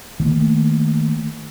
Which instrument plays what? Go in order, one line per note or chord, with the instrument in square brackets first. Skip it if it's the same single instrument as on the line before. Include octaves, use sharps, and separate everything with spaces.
[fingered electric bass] D#3 A3 A#3